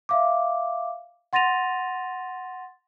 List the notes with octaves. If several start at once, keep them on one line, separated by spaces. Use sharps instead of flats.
E5 F5 D6
F#5 C6 A6 A#6 D#7 F7